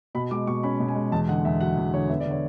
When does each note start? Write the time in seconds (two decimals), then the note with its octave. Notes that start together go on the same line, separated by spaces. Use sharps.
0.15 B2 B5
0.31 G#3 D6
0.47 B2 C#6
0.63 C#4 B5
0.80 B2
0.88 G#5
0.95 G#3
1.12 E2 A5
1.28 D3 F#5
1.45 E2 E5
1.60 F#3 F#5
1.77 E2
1.94 D3 C#5
2.09 B3 E5
2.20 D5
2.26 D3
2.31 C#5